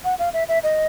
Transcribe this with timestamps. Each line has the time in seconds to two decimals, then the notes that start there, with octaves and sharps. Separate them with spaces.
0.04 F#5
0.19 F5
0.33 E5
0.48 E5
0.63 D#5